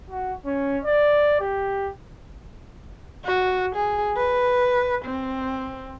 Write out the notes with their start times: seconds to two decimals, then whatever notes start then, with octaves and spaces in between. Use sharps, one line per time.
0.10 F#4
0.46 C#4
0.85 D5
1.40 G4
3.25 F#4
3.75 G#4
4.17 B4
5.05 C4